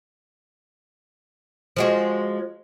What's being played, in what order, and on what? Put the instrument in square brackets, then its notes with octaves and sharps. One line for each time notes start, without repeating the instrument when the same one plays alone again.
[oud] F3 G#3 F#4